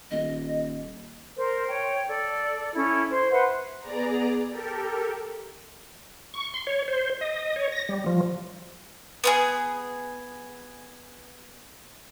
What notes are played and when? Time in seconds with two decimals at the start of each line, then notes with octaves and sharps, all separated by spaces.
0.11 D#1 D#5
1.37 A#4 C5
1.68 C#5 G5
2.07 A4 D5
2.75 C#4 E4 A4
3.11 C5
3.31 B4 C5 E5 F#5
3.80 B3 G#4 D5 A#5
4.50 G4 A4 A#4
6.34 C#6
6.54 C6
6.67 C#5
6.88 C5
7.21 D#5
7.56 C#5
7.72 A#6
7.89 G3
8.06 F3
9.24 B3 D4 G#4